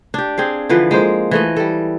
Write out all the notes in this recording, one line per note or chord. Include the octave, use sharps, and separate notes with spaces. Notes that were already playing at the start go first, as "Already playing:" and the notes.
D4 G4
C4 G#4 F5
D3 E3 F3 B4
G#3 A#3 C5
E3 A3 D#5
G3 A4